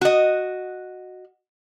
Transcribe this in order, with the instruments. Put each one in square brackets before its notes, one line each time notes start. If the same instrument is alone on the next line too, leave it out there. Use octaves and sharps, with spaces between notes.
[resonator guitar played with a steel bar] F#4 D#5